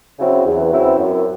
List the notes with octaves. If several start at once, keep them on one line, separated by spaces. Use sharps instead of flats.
C#3 F#3 C4 E4
E2
C#3 F#3 C4 E4
F#2